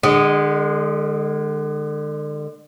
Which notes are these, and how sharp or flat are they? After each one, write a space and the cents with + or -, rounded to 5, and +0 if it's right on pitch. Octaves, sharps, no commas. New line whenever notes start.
D3 +35 G#3 -15 D#5 +0